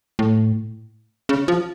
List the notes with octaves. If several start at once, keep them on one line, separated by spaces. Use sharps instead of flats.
A2
C#3
F3